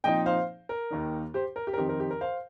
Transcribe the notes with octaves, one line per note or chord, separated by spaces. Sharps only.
A#2 F3 C4 D#4 D#5 G5
C5 F5
A#4
D#2 D#3 A#3 D#4
G4 C5
A#4
G4
A#4
F2 D#3 C4 D#4 G4
A#4
G4
A#4
C5 F5